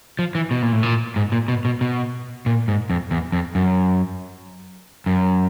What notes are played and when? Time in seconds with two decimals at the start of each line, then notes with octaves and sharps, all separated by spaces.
0.19 F3
0.35 E3
0.51 B2
0.62 A#2
0.72 A2
0.83 A#2
1.16 G#2
1.32 A#2
1.48 B2
1.65 B2
1.81 B2
2.46 A#2
2.68 G#2
2.90 F2
3.11 E2
3.32 F2
3.55 F#2
5.06 F#2